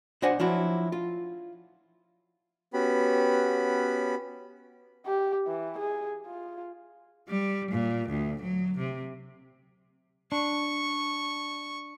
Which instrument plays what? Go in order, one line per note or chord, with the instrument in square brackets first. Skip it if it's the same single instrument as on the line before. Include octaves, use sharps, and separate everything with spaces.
[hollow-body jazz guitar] B1 D4 C5 D#5 F#5 G#5
F3 F#3 D4 E4 F#4
F4
[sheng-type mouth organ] B3 C#4 F#4 G4 B5
[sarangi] G4
E3
G#4
F4
[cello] G3
A#2
D2
F#3
C3
[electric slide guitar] D4 [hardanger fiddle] C#6